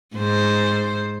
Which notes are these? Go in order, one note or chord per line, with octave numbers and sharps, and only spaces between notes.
G#2 C5